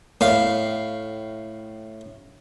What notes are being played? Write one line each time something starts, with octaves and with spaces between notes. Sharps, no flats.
A2 F5